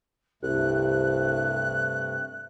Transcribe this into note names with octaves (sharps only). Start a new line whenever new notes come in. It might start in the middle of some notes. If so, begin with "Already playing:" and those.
C2 G2 C3 A3 F#6